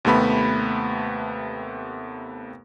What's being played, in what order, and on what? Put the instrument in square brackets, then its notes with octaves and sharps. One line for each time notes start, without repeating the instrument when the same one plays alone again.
[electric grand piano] D#2 C3 A3 B3 B5